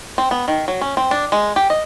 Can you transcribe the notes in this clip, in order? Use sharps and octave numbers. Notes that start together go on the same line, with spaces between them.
C4
B3
D#3
F#3
C#4
C4
D4
G#3
G4
D#5